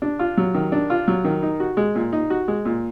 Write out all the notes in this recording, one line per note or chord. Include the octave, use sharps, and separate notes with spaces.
D4
F4
F#3
D#3
D4
F4
F#3
D#3
D#4
F#4
G#3
A#2
D#4
F#4
G#3
A#2